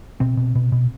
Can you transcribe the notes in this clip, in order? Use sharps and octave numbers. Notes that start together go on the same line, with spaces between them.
B2 C4
B2
B2
B2